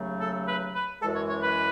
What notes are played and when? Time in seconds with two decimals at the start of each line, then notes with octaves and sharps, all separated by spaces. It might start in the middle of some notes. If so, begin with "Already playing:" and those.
Already playing: D#2 C#3 F#3 A3
0.20 A4
0.48 B4
0.75 B4
1.01 G#3 A4
1.04 F#2 E3
1.15 C#5
1.29 C#5
1.43 B4